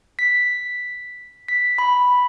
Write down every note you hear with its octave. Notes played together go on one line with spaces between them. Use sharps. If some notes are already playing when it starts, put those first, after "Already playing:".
B6
B6
B5